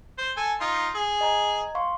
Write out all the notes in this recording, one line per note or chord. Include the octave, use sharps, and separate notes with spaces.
C5
A4 G#5
D#4 F4 C6
G#4
D#5 A#5 G#6
F5 C6 C#6